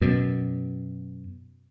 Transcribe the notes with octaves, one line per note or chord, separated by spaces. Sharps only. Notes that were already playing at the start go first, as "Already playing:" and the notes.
F#2 B2